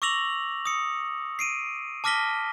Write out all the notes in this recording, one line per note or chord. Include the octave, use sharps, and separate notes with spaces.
C#6 D6 E6 A#6 F7 F#7
D#6 C#7
C7 D7 D#7
A5 D6 F6 A#6 B6 G7